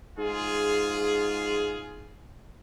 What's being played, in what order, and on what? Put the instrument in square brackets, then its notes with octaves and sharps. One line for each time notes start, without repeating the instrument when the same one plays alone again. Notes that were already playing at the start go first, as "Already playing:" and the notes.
[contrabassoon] G#2 [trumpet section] F4 G#4